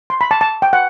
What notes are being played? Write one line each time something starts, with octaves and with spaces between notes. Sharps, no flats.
C6
B5
A5
A5
G5
F#5